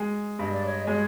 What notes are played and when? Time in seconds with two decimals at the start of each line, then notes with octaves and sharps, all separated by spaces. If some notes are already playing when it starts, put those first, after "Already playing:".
Already playing: G#3
0.39 G2 D#5
0.53 D5
0.65 C#5 D#5
0.87 G#3 C#5 D#5